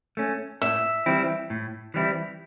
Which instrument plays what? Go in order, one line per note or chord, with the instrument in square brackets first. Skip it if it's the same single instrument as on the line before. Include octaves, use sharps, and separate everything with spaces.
[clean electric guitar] A3 C#4
[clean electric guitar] A2 [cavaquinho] E5
[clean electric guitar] E3 G3 C4 E4
A2
E3 G3 C4 E4